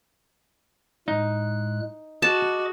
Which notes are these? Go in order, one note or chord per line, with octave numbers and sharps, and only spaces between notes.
A2 G#3 D#4 F#6
F#4 G#4 D#5 A5 D6